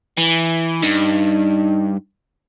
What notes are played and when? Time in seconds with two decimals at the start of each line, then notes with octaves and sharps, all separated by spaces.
0.17 E3
0.82 G2 D#4